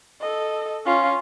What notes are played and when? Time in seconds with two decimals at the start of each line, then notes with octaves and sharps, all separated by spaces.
0.21 A4 D#5
0.86 C#4 F4